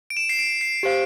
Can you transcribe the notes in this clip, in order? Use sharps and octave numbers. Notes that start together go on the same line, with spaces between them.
D7
E7
C7
D7
C7
G4 C5 F5